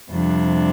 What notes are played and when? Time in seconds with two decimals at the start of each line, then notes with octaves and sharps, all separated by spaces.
0.10 F2 C3 G3 D4